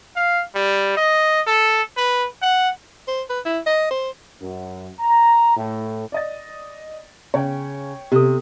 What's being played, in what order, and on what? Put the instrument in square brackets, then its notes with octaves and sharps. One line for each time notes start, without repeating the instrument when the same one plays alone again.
[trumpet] F5
G3
D#5
A4
B4
F#5
[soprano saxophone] C5
B4
E4
D#5
C5
[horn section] F#2
A#5
A2
[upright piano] D5 D#5 A6
[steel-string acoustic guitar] C#3 [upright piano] C#5 G5
[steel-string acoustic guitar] C3 [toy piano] G4 A4